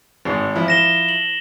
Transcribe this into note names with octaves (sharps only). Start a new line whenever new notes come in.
G#1 G#2
F3 E4
A#6 E7 G7
F#7